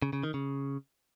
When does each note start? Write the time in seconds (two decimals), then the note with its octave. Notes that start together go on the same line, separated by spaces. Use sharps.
0.02 C#3
0.13 C#3
0.23 D#3
0.34 C#3